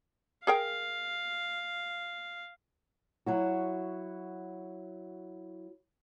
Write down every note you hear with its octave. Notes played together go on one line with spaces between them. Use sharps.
G#4 A#4 F5 G5
F#3 E4 F#4